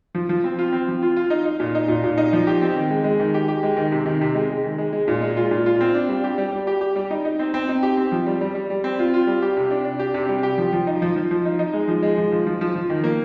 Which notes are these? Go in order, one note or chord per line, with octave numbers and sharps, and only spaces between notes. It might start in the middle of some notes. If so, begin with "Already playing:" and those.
F3
F3
C4
F4
C4
F3
F4
F4
D#4
D#4
A#2
D#4
A#2
A#2
D#4
F3
G4
C4
D#3
G#3
G#3
D#3
G4
G4
G#3
D#3
C3
D#3
C3
G#3
G#3
D#3
G#3
G#3
A#2
G#3
F4
A#2
F4
C4
D4
G3
G4
G3
G3
G4
G4
G3
D#4
D#4
C4
C4
D#4
G4
C4
F3
G3
G3
G3
G3
C4
F4
F4
G3
G4
C3
D4
D4
G4
C3
G3
G4
F3
F3
D#4
F3
F3
F3
D#4
D#4
G#3
F3
G#3
F3
F3
F3
F3
F3
D#3
A#3